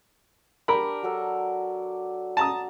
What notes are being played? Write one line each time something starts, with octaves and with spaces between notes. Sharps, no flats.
D4 G4 A#4 B5
F#3 D4 A4
A5 A#5 D#6